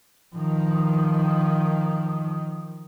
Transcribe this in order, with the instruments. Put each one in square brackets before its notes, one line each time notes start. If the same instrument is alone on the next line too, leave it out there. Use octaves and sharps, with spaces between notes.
[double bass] D#3 F3